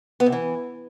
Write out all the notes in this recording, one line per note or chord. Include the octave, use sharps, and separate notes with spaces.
B3
C3
E3